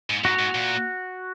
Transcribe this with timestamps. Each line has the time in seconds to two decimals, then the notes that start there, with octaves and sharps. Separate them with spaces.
0.10 G#2
0.24 G#2 F#4
0.39 G#2
0.55 A#2